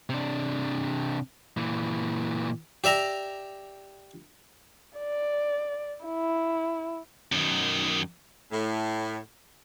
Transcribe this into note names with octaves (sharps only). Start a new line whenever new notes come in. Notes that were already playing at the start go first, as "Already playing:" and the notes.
C3 D4
A#2 E3
G4 D5 E5 A#5
D5
E4
F#2 D#3
A2